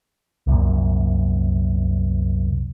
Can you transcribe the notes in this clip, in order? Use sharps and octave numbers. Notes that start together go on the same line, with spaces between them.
C2 F#2 A#2